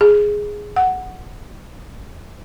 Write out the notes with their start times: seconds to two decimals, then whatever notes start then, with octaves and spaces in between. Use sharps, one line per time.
0.01 G#4
0.76 F#5